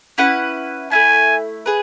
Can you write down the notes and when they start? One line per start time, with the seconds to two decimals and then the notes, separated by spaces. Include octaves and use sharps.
0.18 C#4 E4 B4 F#5
0.91 A3 C#4 E4 G#5
1.66 G#4 B4